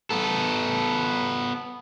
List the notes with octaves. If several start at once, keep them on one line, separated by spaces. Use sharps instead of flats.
B3 A4